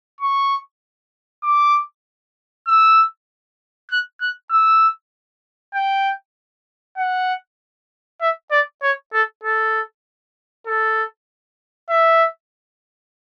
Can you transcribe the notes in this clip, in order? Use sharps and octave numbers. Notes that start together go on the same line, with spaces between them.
C#6
D6
E6
F#6
F#6
E6
G5
F#5
E5
D5
C#5
A4
A4
A4
E5